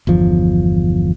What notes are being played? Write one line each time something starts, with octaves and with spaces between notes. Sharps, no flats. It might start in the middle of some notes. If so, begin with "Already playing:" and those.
G1 E2 F3